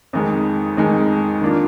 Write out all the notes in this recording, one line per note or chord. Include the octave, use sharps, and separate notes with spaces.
F2 D#3 G#3
F2 D#3 G#3
D#3 A#3 D4 F4